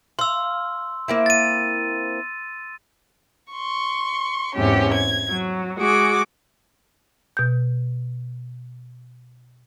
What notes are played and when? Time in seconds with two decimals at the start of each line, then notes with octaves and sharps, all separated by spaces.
0.19 F5 C6 E6
1.08 A#3 C4 E4
1.26 A6 D#7
3.52 C6 C#6
4.55 E2 G#2 C3 C#4 G4
4.93 G#6
5.30 F#3
5.78 G#3 F#4 G#4 D6
7.37 B2 G6